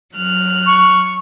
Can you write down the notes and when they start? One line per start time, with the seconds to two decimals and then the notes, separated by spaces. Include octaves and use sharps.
0.15 F#3 F6 F#6
0.66 C#6